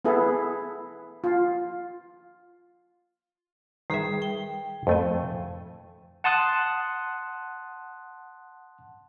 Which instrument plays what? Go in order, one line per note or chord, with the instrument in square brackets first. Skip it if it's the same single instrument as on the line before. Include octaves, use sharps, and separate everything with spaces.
[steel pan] B3 E4 G#4 A4
F4
[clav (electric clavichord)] D#3 B4 E5 [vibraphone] G3 G#4
[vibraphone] G5
[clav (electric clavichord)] F2 A3 G#5
[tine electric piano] F#5 A5 C6 D#6 F#6